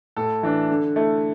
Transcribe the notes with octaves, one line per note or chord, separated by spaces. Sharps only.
A2 A4
E3 D4
D3
A3 E4